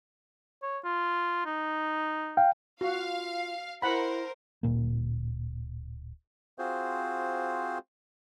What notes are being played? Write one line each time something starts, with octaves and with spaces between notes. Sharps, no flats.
C#5
F4
D#4
F5 G5
F4 F#4 F5
E4 A#4 C5 F#5 B5
D1 A#2 A#3
C4 F4 F#4 G#4 C5